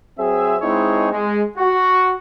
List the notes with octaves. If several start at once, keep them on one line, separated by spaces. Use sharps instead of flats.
F#3 C4 G#4 C5 E5
G#3 C4 D#4 E4 G#4 C#5
G#3
F#4